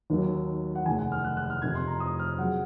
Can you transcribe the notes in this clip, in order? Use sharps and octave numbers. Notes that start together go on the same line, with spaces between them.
D#2 D#3 F#3
F#5
F1 D#2 C#3 G#5
F#5
F6
F#6
F#6
F6
F2 C3 D#3 G#6
C6
A#5
D#6
F6
C#3 F#3 F#5